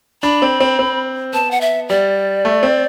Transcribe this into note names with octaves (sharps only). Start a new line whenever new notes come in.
D4 B5
C4
C4
C4
B3 A5
F#5
E5
G3 D5
A3
C4